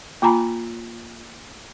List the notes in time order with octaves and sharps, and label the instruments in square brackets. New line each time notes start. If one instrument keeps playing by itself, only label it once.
[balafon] A#3 F4 G#5 A#5 B5